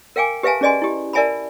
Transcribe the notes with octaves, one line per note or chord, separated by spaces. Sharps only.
A#4 F5 G5 G#5 D6
G4 B4 E5 F5 G#5 A5
C#4 G#4 D5 D#5 G#5 C6
E4 G4
A#4 D5 E5 G#5 A5 B5